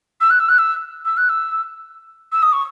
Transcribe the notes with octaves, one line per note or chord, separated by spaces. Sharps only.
E6
F#6
E6
F#6
E6
E6
F#6
E6
E6
D#6
C#6